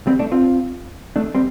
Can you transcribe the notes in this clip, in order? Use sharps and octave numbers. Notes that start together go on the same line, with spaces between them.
G3 C4
A3 D4
C4 F4
A3 D4
G3 C4